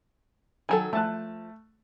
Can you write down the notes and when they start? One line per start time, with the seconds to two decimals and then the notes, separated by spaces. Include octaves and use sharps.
0.69 D#3 F#3 A4 G#5
0.93 F3 A3 A5 F#6